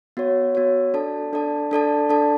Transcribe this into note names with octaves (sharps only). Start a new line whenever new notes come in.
B3 F#4 C#5
B3 F#4 C#5
D4 A4 D5 A5
D4 A4 D5 A5
D4 A4 D5 A5
D4 A4 D5 A5